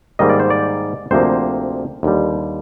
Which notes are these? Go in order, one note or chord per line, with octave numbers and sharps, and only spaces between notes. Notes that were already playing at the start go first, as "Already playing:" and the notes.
G#2 D#3 G3 A#3 D#5
D5
C5
D5
D2 C3 F3 A#3 C5
D#2 D3 G3